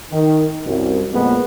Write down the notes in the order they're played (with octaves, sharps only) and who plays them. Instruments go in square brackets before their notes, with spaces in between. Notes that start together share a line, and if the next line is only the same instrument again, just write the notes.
[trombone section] D#3
C2 F#2
F2 A#2 G#3 B3